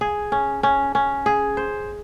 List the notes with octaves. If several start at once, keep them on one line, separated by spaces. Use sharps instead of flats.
G#4
C#4
C#4
C#4
G#4
C5